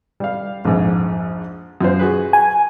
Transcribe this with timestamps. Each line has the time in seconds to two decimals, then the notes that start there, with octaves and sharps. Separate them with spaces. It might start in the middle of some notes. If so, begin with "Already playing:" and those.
0.20 G3 F5
0.65 A#1 F2 G#2
1.81 F#2 F4 C5
1.99 F#4 G#4 B4
2.33 G#5